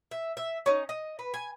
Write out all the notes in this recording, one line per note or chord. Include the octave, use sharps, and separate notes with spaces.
E5
E5
C#4 D#4
D#5
B4
G#5